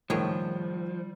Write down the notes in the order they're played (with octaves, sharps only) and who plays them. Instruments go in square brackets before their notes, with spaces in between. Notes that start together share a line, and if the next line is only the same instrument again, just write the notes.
[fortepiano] G#1 C#2 A2 [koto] D#3 G#4 C#5 [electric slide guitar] F3 [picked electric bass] G3